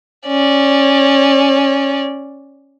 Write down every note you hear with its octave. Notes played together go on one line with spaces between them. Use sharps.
C#4 D5